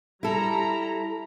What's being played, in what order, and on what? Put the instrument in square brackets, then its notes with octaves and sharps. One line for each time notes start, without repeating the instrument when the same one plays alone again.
[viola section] G3 A#5 [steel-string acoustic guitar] E4 A4